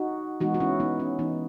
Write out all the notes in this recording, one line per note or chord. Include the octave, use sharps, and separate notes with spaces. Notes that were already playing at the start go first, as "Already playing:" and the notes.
Already playing: D#4 F#4
E3 G#3 B3 D#4 F#4
F#4
C#4 E4
B3 D#4
C#4
E3 B3 D#4